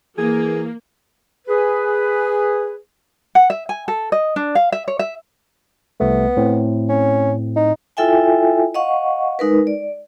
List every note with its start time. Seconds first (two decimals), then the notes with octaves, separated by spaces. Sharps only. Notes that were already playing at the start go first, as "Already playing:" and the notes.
0.18 E3 A#3 G#4
1.48 G#4 B4
3.35 F#5
3.50 E5
3.69 G#5
3.88 A4
4.12 D#5
4.36 D4
4.55 F5
4.72 E5
4.88 C#5
4.99 E5
6.00 C2 A3 B3
6.37 A2 C4
6.89 C#4
7.56 D#4
7.97 E4 F4 A4 E5 G5 G#5
8.74 D#5 F5 F#5 C#6
9.39 G#3 D#4 A#4 B4
9.67 D5